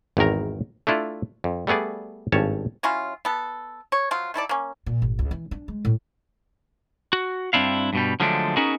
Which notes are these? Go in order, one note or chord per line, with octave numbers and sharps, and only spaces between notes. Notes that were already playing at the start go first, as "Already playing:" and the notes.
G#1 E2 D#3 A#4 A#5
A3 D4 E4 F4
F2
G3 A3 B3 G#4 D5
G#1 G2 C#4 C#5 A5
F#3 C#4 E4 F4
B3 A4
C#5
F3 F#3 F4
D#3 E4 A4 D5
A#3 C#4
A#2
G#1
C#2
E3
D4
G#3
A2
F#4
G2 C4 D4 E4 F5
G2 B2 G3
D3 F3 F#3 G#3 A3 D4
B3 C#4 D#4 F#4 G#4 A#4